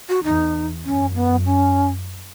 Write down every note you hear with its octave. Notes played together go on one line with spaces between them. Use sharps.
F#4
E2 D#4
F#2 C#4
B3
C#4